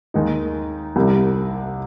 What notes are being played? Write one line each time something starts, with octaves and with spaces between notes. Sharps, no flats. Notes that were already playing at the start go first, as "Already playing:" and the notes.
D#2 D#3 G#3 D#4
C2 C3 G3